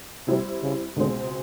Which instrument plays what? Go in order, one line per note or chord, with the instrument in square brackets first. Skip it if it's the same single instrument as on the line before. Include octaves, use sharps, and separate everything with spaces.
[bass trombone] C3 [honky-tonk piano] G3 C4 E4
[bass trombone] C#3
[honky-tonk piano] C#2 B2 G#3 C4 [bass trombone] D3